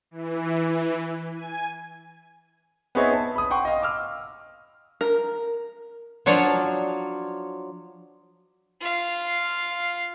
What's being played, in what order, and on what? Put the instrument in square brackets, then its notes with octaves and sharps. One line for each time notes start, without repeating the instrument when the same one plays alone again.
[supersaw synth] E3
G#5
[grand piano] B3 C4 D#4 G#4 C#5 E5
A5
B5 D#6
F#5 G5 C6 C#6
D#5 F5
D6 E6 F6
[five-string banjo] A#4
[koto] F3 F#3 D4 C#5
[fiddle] F4 F5